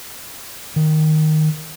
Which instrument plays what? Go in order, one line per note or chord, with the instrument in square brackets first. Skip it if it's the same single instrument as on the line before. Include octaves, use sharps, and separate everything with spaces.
[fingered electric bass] D#3